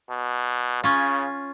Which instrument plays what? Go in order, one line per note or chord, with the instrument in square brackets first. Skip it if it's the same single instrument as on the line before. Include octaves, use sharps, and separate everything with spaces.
[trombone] B2
[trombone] C#3 [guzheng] C#4 F4